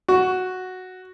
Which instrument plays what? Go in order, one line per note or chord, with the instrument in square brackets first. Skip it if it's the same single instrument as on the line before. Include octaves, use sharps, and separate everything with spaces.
[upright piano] F#4